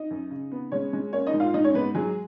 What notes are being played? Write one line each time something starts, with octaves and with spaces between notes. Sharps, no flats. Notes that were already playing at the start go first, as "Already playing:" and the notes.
Already playing: D#4 D#5
F#2
C#3
B3
G#3 C#4 C#5
G#3
A#3 C#4 C#5
D#4 D#5
G#2
F4 F5
G#2 D#4 D#5
C#4 C#5
G#2 B3 B4
F#3 G#3 G#4